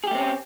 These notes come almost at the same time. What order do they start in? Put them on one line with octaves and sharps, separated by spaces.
G#4 G4 A3 C4 C#4